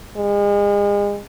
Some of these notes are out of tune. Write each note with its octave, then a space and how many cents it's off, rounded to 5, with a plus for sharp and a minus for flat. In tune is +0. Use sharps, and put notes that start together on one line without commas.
G#3 -35